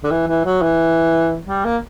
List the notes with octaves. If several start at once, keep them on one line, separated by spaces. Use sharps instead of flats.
D3
E3
E3
F#3
E3
G3
A#3